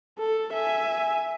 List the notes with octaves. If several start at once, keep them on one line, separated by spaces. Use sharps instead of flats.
A4
E5 G#5